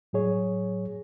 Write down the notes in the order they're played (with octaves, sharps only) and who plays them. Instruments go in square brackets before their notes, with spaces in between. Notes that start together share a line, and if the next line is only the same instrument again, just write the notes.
[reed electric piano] A2 F#3 G#4 C#5